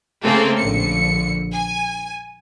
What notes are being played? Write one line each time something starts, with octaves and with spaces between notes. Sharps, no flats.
C#3 A3 A#3 C4 G#4 A4
A#1 D3 C#7
G#5